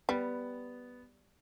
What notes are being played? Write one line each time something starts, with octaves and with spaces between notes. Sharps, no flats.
G3 B3